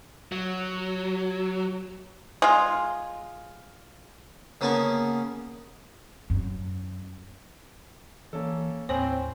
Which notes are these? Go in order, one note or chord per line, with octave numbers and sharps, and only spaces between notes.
F#3
G#3 F4
C#3 A#3 B3 C#4 A5 C#6
F#2
E3 A#3 C#4 A4
D#2 A2 C4 C5 C#5 G#5